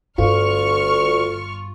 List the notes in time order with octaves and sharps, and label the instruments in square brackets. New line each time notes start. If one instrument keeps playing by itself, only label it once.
[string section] G1 C#6 F6 [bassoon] D2 [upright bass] G2 [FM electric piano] F4